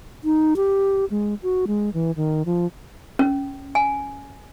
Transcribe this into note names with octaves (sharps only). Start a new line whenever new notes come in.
D#4
G4
G#3
F#4
G#3
E3
D#3
F3
C#4
G#5